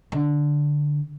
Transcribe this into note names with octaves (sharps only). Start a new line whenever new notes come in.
D3